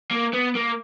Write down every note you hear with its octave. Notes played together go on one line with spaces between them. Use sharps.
A#3
B3
A#3